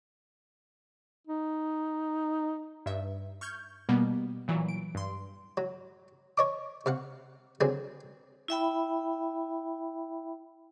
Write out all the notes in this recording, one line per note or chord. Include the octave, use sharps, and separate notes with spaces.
D#4
G2 E5
C#6 F6 G6 G#6
B2 G3 A#3 B3
A#2 E3 F#3
D7
G2 C6
F#3
C#5 D#5 D6
C3 F5 F#5
D3 F#3 C4 G#4
E4 E5 G5 B5